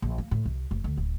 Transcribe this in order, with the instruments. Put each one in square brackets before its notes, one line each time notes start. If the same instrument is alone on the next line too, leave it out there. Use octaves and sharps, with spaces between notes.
[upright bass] A#1
A#3
A2
C2
F1
D2
D1